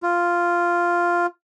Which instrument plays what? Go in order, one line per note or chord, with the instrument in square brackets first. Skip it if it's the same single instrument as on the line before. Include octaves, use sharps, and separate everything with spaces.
[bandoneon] F4